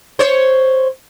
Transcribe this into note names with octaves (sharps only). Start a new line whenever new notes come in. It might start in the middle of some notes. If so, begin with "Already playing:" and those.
C5 C#5